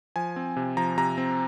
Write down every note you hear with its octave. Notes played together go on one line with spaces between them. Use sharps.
F3 G#5
C4
C3
F3 A#5
C3 A#5
C4